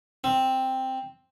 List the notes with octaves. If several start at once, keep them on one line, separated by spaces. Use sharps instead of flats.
C4